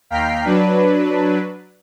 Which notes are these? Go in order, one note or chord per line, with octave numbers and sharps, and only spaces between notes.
D#2 F5 G5 A#5 B6 C7
F#3 D4 B4